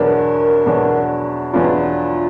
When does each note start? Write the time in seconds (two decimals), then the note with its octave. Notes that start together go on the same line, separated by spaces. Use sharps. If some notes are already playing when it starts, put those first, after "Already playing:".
Already playing: E2 B2 F#3 B3 D4 A#4
0.66 E2 B2 F#3 B3 D4
1.53 E2 B2 F#3 B3 D4 F4